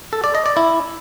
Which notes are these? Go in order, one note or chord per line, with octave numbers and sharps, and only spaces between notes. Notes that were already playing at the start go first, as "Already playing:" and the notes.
A4
D5
D#5
D5
E4